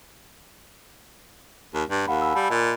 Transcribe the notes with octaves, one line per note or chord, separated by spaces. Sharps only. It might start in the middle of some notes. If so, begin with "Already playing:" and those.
D#2
G2
D#2 F5 F#5 B5
G#5 B5 E6
G3 A5 B5
A#2 D#5